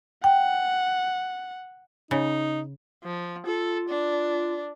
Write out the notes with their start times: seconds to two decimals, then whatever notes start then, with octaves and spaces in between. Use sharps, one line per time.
0.24 F#5 G5
2.11 C#3 D#4
3.04 F3
3.46 F4 A4
3.89 D4